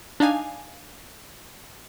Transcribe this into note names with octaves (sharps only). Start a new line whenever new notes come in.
D4 D#4 F5 G#5